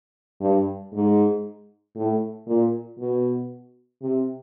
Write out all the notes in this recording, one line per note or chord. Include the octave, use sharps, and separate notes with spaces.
G2
G#2
A2
A#2
B2
C3